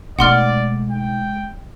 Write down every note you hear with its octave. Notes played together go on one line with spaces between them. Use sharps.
B2 G#3 A3 D#4 D5 F#5 C6 F6
G5